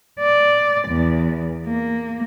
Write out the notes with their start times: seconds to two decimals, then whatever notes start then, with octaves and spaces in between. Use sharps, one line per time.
0.20 D5
0.89 E2
1.67 A#3